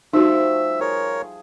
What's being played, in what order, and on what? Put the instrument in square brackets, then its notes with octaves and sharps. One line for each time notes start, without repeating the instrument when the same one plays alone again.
[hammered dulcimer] F3 G3 A3 [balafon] D#4 F#4 [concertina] E5
[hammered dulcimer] G#4 [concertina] A#4 C#5